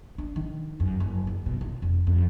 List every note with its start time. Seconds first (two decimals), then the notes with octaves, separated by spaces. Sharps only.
0.18 D4
0.36 D#3
0.80 F#2
1.00 F#1
1.27 F#1
1.46 B2
1.61 F4
1.82 F1
2.07 F2